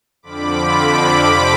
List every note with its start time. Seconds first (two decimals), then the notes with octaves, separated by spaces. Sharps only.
0.23 F2 D3 F3 B5 D6
0.74 B5 D6
1.23 F2 C3 F3